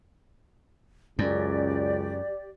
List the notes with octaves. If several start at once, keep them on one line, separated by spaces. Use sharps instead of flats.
C#2 F#2 G4 D5